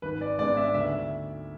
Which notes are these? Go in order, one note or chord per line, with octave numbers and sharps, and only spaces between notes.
G#1 B4
D5
G#2 G#3 B3 D4 D5
E5
D2 E5